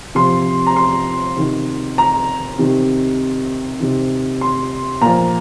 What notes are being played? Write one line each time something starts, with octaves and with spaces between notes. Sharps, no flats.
C3 F3 C6
A#5
C6
C3 D#3
A#5
C3 D#3
C3 D#3
C6
A#2 F3 A#5